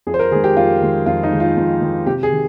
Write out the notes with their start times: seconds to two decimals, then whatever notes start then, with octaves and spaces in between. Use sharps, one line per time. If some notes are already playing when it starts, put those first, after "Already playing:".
0.07 F2 G#4
0.14 C5
0.19 A#4
0.32 D#3 G#4
0.35 G#3
0.44 G4
0.57 F2 F4
0.81 D#3 G#3
1.06 F2 F4
1.23 D#4
1.32 D#3 G#3
1.40 F4
1.57 F2
1.81 D#3 G#3
2.07 C3 G4
2.23 G#4
2.32 D#3